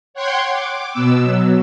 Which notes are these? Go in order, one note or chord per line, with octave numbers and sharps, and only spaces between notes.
C#5 F#5 G5 C6 F#6 G#6
D6
B2 B3 E6
F#3